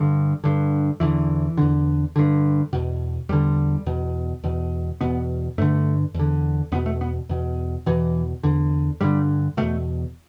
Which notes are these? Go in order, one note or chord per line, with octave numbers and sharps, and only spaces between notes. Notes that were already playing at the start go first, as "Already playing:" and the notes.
Already playing: G2 D3
G2 D3
E2 D3 E3
E2 D3
G2 D3
E2 B2
E2 D3 G3
E2 B2
E2 B2
E2 B2 B3
G2 D3 A3
E2
D3
E2 B2 B3
A3
B3
E2 B2
E2 B2 E3
E2 D3
G2 D3 G3
E2 B2 A3